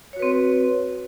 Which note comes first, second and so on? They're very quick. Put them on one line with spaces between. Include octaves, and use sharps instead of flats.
C#5 F#4 B4 C4